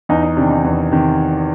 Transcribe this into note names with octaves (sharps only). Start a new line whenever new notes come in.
E2 D#4
D#4
C3 D#3 D4
D#4
E2
C3 D#3